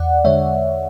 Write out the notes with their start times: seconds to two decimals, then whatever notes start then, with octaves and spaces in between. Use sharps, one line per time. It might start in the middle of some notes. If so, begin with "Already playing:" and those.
Already playing: E2 D5 F#5
0.24 D3 G#3 C#5 E5